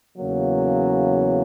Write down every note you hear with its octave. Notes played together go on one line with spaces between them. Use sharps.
E2 C#3 F#3 A#3